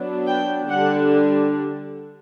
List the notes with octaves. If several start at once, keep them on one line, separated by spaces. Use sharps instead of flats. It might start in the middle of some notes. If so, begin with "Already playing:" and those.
Already playing: F#3 B3 D4
G5
D3 G3 D4 F#5